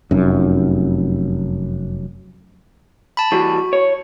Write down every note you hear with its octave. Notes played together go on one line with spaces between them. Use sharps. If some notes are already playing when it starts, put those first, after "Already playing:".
F1 F#2
A5 B5
E3 G3 F#4
C#5